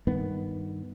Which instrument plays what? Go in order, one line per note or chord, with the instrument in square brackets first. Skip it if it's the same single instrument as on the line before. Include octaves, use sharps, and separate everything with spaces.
[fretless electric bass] G2 D#3 B3